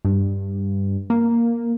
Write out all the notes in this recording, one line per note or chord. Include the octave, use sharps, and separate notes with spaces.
G2
A#3